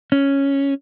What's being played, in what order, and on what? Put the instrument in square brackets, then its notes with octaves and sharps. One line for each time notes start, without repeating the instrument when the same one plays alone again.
[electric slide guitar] C#4